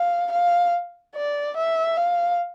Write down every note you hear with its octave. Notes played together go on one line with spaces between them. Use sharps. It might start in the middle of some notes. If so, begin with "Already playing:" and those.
Already playing: F5
F5
D5
E5
F5